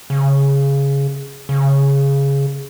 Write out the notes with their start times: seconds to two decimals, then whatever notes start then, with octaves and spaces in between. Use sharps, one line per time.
0.10 C#3
1.49 C#3